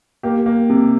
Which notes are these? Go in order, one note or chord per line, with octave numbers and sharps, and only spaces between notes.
A#3 G4
A#3
C3